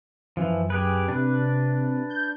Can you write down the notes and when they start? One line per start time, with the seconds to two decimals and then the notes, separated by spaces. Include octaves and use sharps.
0.37 F#2 E3 F3
0.70 G4 G#4 B4
1.08 C3 D4 B4
2.10 G6